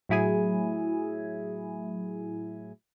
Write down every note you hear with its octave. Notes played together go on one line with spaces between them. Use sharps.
A2 F#3 E4 G#4 G#5